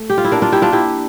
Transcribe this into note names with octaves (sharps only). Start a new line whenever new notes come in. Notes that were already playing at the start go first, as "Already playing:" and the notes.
Already playing: A3
G4
F4
E4
A#3 D4
D4 F4
E4 G4
D4 F4
E4 G4